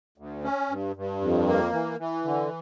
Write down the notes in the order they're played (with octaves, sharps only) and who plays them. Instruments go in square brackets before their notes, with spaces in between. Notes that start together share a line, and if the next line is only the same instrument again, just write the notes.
[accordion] D2
C#4
G2
G2
F2
A#3
E3
E3
D3